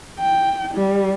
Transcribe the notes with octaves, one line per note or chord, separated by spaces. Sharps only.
G5
G3